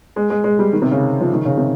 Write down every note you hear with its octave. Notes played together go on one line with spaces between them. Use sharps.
G#3
G#3
G#3
G3
D#3
C3
C#3
F3
D#3
C#3
C3